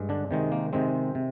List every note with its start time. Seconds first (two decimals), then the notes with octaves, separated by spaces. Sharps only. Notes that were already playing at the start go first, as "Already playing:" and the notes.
Already playing: G2 G#3
0.09 D3 D4
0.31 C3 D#3 G#3
0.52 A#3
0.73 C3 D#3 G#3 C4
1.15 C3